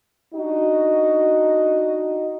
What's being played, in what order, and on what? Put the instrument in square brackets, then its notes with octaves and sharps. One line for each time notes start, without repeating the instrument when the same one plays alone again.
[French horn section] D4 D#4 F#4 D#5